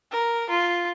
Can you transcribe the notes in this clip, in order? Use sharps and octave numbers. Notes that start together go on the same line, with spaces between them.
A#4
F4